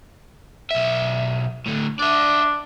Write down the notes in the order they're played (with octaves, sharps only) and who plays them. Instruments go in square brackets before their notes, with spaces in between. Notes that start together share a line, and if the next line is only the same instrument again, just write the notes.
[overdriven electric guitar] B1 E5
A2 D3
[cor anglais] D4 [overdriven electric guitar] D5 E5